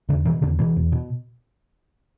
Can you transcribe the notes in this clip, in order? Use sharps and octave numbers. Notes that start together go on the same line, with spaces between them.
E2 D3
B2 E3
E2 D3
B2 E3
E2
B2